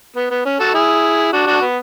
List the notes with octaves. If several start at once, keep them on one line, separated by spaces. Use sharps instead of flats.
B3
B3
C#4
F#4 A4
E4 G#4
D4 F#4
D4 F#4
B3